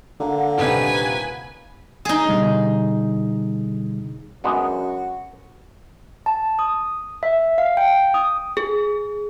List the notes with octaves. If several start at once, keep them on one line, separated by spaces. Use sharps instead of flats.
D3 A#3 F#5
D#1 C3 D#4 B4 G#5
D#4 G#4
B2 D3 G3
F#2 G#3 B3 D4 F#4
A5
D#6
E5
F5
G5
D#6
G#4